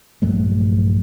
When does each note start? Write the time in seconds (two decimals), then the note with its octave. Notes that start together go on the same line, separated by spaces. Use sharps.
0.22 A#1 G2 F#3 A3